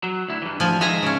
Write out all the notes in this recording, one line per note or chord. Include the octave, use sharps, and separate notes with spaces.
F#3
D2 E4
G2 E3
D2 F3 G#5
D#3 G#3 E5 G#5 A#5
C#3 C#4